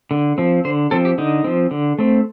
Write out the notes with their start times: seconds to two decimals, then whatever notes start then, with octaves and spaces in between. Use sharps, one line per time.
0.11 D3
0.38 F3 C4
0.65 D3 C5
0.91 F3 C4 A4
1.05 G4
1.18 D3 D#4
1.44 F3 C4
1.71 D3
1.99 A3 C4